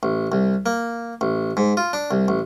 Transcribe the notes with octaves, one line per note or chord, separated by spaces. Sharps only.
A1
C2
A#3
A1
G#2
F4
D4
C2
A1